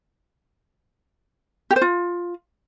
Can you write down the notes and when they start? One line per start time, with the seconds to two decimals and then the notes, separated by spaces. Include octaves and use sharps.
1.71 G4
1.76 C5
1.82 F4